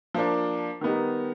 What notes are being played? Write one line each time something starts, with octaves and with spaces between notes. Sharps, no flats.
F3 A#3 D4
D#3 G3 B3 D#4